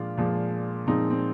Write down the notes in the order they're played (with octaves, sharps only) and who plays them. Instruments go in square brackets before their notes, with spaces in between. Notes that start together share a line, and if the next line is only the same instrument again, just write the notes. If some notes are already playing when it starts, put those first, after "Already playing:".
Already playing: [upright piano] A#2 F3 G#3 D4 F4
A#2 F3 G#3
A#2 F3 G#3 C4 D#4
C4